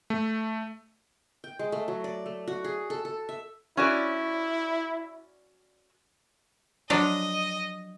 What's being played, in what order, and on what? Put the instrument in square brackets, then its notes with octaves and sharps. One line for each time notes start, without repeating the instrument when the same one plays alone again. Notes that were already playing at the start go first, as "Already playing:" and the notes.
[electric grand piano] A3
[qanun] G5
G#3
A3
F#3
D5
A3
F#4
G#4
A4
A4
E5
[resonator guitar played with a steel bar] C#4 F#4 D5 [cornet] E4
[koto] F3 F#3 D4 [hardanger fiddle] D#5